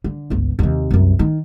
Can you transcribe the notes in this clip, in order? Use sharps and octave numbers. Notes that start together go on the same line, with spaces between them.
D3
G1 C#2
D#2 C3
C2 F#2
D#3